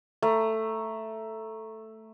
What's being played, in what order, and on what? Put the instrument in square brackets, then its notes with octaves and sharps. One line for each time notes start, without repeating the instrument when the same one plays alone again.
[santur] A3 A#5